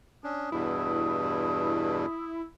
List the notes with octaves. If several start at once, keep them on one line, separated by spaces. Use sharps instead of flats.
C#4 D4 D#6
E2 G2 B2 E4